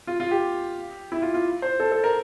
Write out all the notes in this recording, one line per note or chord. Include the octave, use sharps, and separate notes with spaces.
F4
F4
G4
E4
F4
F4
C5
A4
A4
A#4